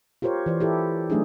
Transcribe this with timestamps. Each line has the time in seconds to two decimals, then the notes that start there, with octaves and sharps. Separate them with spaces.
0.22 F4 G4 A#4 C5 C#5
0.46 E3 C5 D5
0.60 E4 G4 A4
1.10 F#3 A3 D4 D#4 G#4